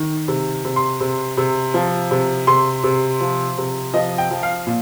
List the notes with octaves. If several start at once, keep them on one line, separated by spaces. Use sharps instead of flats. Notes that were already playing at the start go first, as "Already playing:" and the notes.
Already playing: D#3
C3
C3
C6
C3
C3
F3
C3
C3 C6
C3
F3
C3
F3 D#5
G5
F3
F5
A#2